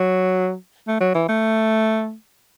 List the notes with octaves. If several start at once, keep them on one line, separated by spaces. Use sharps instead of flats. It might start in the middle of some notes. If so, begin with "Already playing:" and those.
Already playing: F#3
A3
F#3
E3
A3